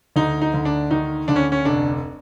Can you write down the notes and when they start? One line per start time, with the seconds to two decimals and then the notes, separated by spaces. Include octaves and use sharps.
0.16 D2 D#4
0.42 D#4
0.54 D2
0.65 D4
0.91 D#3 D#4
1.28 D2 D4
1.36 C#4
1.52 C#4
1.65 F1 D4